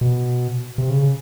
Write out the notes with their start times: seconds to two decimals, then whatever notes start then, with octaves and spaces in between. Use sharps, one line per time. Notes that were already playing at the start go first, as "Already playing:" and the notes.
0.01 B2
0.78 C3
0.90 C#3